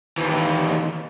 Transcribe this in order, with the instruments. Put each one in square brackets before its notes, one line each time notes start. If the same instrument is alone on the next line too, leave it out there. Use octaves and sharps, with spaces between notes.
[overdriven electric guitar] D#2 E3